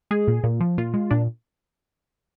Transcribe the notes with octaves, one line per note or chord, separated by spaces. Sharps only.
G#3 G#4
A#2
A#2
F3
A#2 F4
G#3
A#2 D4